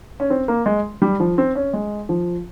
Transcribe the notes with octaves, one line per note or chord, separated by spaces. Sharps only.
C#4
C4
A#3
G#3
G3
F3
C4
C#4
G#3
F3